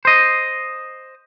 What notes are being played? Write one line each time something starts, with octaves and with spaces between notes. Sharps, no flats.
C5 D#5